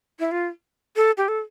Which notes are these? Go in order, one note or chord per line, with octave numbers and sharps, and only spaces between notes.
E4
F4
A4
G4
A4